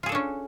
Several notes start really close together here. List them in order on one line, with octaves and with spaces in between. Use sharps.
F4 G#4 A4 D4 C#4